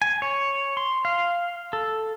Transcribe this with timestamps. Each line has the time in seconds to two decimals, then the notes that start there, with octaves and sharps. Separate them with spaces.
0.02 G#5
0.22 C#5
0.77 C6
1.05 F5
1.73 A4